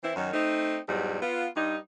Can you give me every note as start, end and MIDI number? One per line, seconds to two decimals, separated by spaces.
0.03 0.14 52
0.03 0.14 60
0.03 0.14 64
0.15 0.30 42
0.15 0.30 51
0.15 0.30 54
0.33 0.78 57
0.33 0.78 60
0.33 0.78 63
0.88 1.20 40
0.88 1.20 44
0.88 1.20 54
0.88 1.20 55
1.22 1.46 59
1.22 1.46 65
1.56 1.76 43
1.56 1.76 63